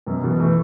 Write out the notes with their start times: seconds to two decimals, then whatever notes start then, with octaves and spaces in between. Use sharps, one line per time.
0.07 F#2 B2
0.23 B2 E3
0.40 E3 A3